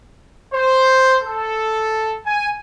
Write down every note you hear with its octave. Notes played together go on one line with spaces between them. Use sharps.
C5
A4
G#5